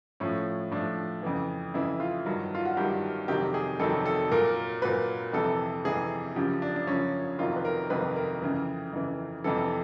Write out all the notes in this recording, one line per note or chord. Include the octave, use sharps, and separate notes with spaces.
A2 F3 C#4
A2 F3 D4
F2 C#3 E3
F2 C#3 E3 E4
F4
G2 D#3 F#3
F4
F#4
G2 D#3 F#3 G4
F2 C3 D#3 F#3 G4
G#4
F2 C3 D#3 F#3 A4
A4
A#2 F#3 A#4
A#2 F#3 B4
F2 C3 E3 A4
F2 C3 E3 G#4
F#2 C#3 F3 G4
D4
D4
F#2 C#3 F3 C#4
F2 C3 D#3 F#3 F4
B4
A#4
F2 C3 D#3 F#3 B4
A#4
F2 C#3 E3
F2 C#3 E3
F2 C3 E3 A4